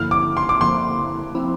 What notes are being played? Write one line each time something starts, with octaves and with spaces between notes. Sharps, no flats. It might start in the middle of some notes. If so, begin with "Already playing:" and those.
Already playing: G2 D3 F3 A#3 E4 F6
D6
C6
D6
G2 D3 F3 A#3 E4 C6
F3 C4 E4